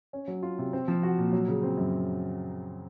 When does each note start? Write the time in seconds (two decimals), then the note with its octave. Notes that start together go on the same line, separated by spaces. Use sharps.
0.13 C#4
0.28 F#3
0.43 F4
0.59 C3
0.73 C4
0.88 F3
1.03 F#4
1.18 A#2
1.33 F#3
1.48 C#3
1.63 C4
1.77 F#2